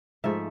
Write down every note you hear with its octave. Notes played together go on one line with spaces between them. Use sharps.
G#2 F3 A3 E5